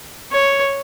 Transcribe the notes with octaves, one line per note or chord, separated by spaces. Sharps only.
C#5